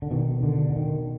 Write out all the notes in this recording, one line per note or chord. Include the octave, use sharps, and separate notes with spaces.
D3
B2 D#3
D3
D3
D#3